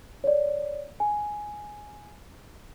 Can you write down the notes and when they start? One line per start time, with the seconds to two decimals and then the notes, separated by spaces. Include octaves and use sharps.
0.24 C#5 D5
1.00 G#5